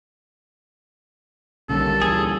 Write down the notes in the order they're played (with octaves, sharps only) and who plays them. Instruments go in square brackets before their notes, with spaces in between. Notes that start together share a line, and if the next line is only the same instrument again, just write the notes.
[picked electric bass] B1 D3 D#3 [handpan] G3 A#3 C#4 [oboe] A4
[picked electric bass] D2 A#2 E3 [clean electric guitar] G#4